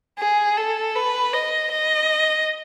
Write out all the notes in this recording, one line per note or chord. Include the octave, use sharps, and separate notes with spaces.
G#4
A4
B4
D#5
D#5